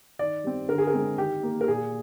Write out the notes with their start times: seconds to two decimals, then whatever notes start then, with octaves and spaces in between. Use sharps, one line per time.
0.19 D#3 D5
0.44 G3 C4
0.69 D3 A#4
0.78 G#4
0.87 A#4
0.94 G#3 C4
1.18 D#3 G4
1.43 A#3
1.61 A#4
1.68 A#2 G#4